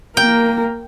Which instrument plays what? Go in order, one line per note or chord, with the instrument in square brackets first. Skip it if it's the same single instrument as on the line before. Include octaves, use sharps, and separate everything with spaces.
[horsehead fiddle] A#3 A#4 [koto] G5